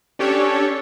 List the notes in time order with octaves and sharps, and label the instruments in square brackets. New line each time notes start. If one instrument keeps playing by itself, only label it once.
[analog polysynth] C#4 D4 G4 A4 C#5